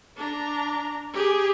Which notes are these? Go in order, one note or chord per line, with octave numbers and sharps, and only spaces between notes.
D4 A#5
G4 G#4